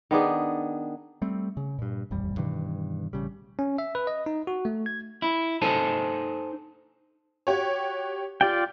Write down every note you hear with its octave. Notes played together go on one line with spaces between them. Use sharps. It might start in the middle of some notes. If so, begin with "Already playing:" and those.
D#3 B3 D4 G#4
G3 A3 C4
C#3
G2 A#2
D#1 A1 F2 G3
G2 B2 D#3 E3
A1 C#3 G3
C#4
E5
B4
D#5
D#4
F#4
A3
G#6
E4
D#4 A4 C5 G#5 A5
F#4 G4 C#5
F4 G4 D5 G5